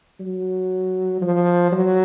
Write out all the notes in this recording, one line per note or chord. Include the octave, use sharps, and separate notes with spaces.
F#3
F3
F#3